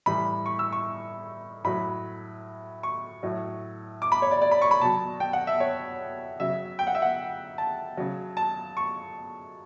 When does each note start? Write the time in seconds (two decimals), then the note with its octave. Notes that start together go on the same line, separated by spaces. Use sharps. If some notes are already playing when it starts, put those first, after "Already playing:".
0.06 A2 E3 G3 B5
0.46 C#6
0.59 E6
0.72 C#6
1.64 A2 F#3 B5
2.83 C#6
3.23 A2 F#3
4.02 D6
4.12 B5
4.22 C#5
4.31 D5
4.42 D5
4.52 B5
4.62 C#6
4.71 B5
4.81 B2 F#3 A5
5.20 G5
5.33 F#5
5.47 E5
5.60 C#5
6.40 C#3 F#3 E5
6.79 G5
6.87 F#5
6.95 E5
7.02 F#5
7.58 A5
7.97 C#3 F#3
8.37 A5
8.77 C#6